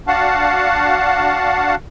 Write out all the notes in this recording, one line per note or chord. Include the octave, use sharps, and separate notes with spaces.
D4 F#4 F5 F#5 A5